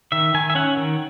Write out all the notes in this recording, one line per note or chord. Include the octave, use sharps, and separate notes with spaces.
D#3 E5
D#3 G#5
E5
C#4 F#5
D#3